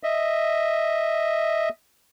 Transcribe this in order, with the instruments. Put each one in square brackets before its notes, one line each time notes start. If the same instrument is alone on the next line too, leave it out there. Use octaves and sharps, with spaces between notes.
[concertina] D#5 E5